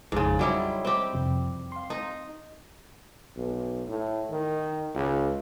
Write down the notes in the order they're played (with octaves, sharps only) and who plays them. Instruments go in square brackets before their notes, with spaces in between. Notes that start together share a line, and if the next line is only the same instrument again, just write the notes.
[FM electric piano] A1 F2 A6 [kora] G#2 C#3
[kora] F#3 G3 E4 [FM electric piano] C#5 D#5 C6
[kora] C4 G4
[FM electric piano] F2 C3 F3
F5 C6
[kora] D#4
[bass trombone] B1
A2
D#3
C#2